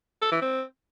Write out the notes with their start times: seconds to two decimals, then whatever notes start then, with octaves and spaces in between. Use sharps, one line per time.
0.22 A4
0.32 E3
0.42 C4